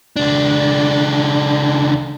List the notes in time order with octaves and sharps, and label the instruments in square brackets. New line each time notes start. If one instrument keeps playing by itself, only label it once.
[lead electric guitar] C#2 D4